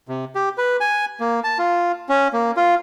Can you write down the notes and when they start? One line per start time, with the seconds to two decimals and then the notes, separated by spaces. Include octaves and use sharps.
0.08 C3
0.35 G4
0.58 B4
0.80 G#5
1.20 A#3
1.44 A5
1.58 F4
2.09 C#4
2.33 A#3
2.57 F4